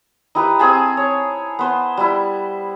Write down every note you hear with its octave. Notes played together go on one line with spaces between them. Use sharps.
D#4 E4 G4 B4
C4 G#4 G#5 A5
C#5
B3 C5
G3 E4